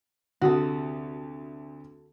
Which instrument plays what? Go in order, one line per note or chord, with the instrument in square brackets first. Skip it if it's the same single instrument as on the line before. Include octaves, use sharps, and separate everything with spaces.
[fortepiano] D2 C3 D#6 [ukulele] F#4 A4